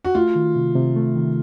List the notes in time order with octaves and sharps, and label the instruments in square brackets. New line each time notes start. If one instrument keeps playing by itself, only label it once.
[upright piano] F#4
[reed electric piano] A3 [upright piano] F4
[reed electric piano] D#3
C3
C3
A3
D#3